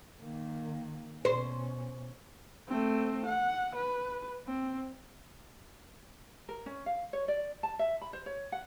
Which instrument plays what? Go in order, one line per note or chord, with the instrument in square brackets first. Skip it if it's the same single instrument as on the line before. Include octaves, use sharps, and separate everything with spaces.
[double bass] D#3 A#3
[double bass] B2 C#4 [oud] C5
[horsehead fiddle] A3 C4
F#5
B4
C4
[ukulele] A#4
C#4
F5
C#5
D5
A5
E5
B5
C5
C#5
F#5